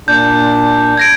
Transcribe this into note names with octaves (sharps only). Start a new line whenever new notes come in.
A#2 D4 G6
G#6 A#6 D7